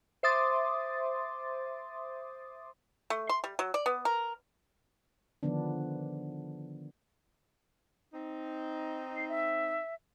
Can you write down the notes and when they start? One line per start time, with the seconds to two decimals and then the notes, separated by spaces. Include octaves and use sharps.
0.23 C5 E5 C6 D6 D#6 A6
3.10 A3
3.29 C6
3.44 G3
3.59 F#3
3.74 D5
3.86 B3
4.05 A#4
5.43 D3 D#3 F3 B3 D4
8.13 C4 D#4
9.16 C7
9.29 E5